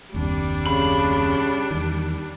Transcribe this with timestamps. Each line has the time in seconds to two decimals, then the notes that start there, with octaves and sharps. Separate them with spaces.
0.14 F#1 D#2 C3 G3 D4
0.67 C#3 B5
1.71 E2 D#3